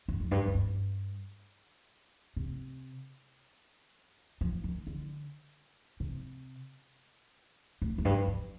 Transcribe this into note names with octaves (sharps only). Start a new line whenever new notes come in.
G2
F2
G2
F2
G2
C3
F3
D#3
D3
C3
A2
F2
G2
F2